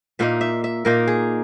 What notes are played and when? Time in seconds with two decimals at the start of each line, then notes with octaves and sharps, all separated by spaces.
0.19 A#2 A#3 D#4 E5
0.41 E5
0.64 E5
0.85 A#2 A#3 D#4 A#4
1.08 G#4